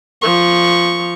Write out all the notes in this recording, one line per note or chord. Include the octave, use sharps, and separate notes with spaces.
F3 C#6